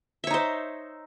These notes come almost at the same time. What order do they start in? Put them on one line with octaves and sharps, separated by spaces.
E5 C#5 D#4 C5